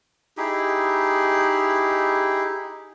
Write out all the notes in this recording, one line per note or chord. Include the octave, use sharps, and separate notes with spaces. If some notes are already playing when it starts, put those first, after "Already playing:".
D#4 E4 G4 G#4